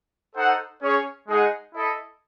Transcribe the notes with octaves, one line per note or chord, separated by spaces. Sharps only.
D#4 A4 C5 F#5
C#4 G#4 C#5
G#3 D#4 G#4 D#5 F#5
E4 A4 D#5